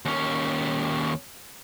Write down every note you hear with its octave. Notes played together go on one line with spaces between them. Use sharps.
D#2 C#4